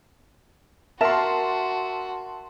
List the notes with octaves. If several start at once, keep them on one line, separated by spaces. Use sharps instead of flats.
F#4 A#4 E5 A5 C6 E7